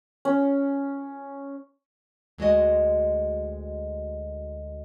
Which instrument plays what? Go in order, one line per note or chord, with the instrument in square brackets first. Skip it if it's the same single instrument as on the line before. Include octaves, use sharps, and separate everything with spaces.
[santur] C#4
[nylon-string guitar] D2 G#3 F#4 D#5